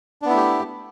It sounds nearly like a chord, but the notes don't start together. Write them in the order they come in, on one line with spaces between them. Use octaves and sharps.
D4 B3 E4 A3 G4